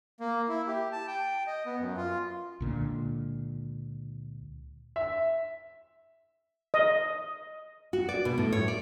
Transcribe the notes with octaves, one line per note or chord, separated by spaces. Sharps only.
A#3
E4
G4
A5
G5
D#5
B3
F#2
F4
C#2 A#2 D3
E5
D#5
F#4
D5
B2
A2
C#5
D5